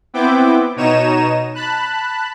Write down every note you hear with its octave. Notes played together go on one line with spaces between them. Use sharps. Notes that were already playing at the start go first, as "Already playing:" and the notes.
B3 C4 E4 G5 D6
B2 D#4 C#5 A#5 D#7 E7
A5 B5 F#6